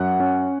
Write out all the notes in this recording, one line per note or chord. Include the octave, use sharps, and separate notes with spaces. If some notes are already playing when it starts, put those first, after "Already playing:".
Already playing: F#2 F#5
C#4